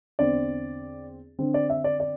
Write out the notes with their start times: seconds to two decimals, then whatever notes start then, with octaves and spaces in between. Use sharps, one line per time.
0.19 E2 D3 C4 D5
1.39 D3 C4
1.54 D5
1.70 E5
1.84 D5
2.00 D5